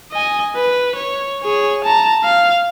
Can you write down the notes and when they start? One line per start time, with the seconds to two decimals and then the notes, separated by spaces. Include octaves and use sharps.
0.12 D#5 G#5
0.56 B4
0.96 C#5
1.42 G#4 C#5
1.85 A5 A#5
2.24 F5